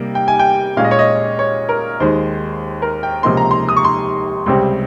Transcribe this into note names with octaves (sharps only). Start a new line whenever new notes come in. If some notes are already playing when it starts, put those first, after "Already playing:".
Already playing: C3 G3 A#3 D#4
G5
G#5
G5
A#2 G#3 C#4 F5
D#5
C#5
D#5
C#5
A#4
D#2 D#3 G#3 C5
A#4
G5
C#2 C3 F3 A#3 D#4 C6
A#5
C6
D#6
C#6
C6
C#2 C3 G3 C4